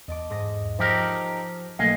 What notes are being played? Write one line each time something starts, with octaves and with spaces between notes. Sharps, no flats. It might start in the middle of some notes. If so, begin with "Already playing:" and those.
E2 D#5 A5 D6
G#2 D#6 A#6
F3 D#4 G4 A#4 C5 A5 E6 D7
B1 F#3 A3 A#3 D#5 F5 G#5 C#7